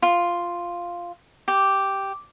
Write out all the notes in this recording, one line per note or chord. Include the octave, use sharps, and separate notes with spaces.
F4
G4